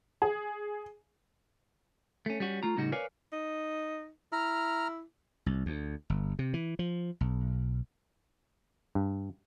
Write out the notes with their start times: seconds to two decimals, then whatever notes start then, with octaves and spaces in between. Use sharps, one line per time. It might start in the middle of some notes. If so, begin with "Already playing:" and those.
0.22 G#4
2.26 A3 C#4
2.40 G3 C#4 F#4
2.63 A3 F4 A#5
2.77 A2 C#3 G3 D#4 F#4
2.92 A#4 B4 C#5 D5 F5 G#5
3.32 D#4
4.32 E4 A#5 F6
5.46 C2
5.66 D2
6.10 G1
6.39 C3
6.54 E3
6.79 F3
7.21 B1
8.95 G2